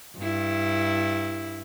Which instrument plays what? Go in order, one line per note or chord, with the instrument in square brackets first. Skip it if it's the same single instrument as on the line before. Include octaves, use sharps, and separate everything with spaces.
[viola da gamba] G2 E4